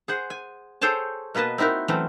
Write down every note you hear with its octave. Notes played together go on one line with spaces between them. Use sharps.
G#4 C5 F#5
G#5
G#4 A4 C5 C#5 G5 A5
B2 A#3 B4 D#5 A5
C4 D#4 E4 F#4 A#4
E3 F#3 A3 C4 C#4